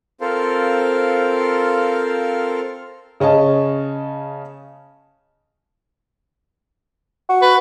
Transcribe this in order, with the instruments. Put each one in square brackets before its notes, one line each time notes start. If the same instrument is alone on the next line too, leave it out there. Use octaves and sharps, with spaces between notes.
[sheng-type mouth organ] C4 F4 A4 A#4 C5 F5
[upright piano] C#3 C#4 D#5 A5
[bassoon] F#4
[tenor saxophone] B4